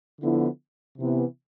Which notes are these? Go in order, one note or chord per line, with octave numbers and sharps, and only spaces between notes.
D3 F3 B3 E4
C3 E3 B3